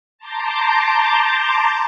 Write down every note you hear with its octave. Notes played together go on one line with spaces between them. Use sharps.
A5 A#5 C6 D6 G6